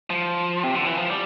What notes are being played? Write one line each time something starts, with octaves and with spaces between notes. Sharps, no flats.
F3
C3
D3
E3
F3
G3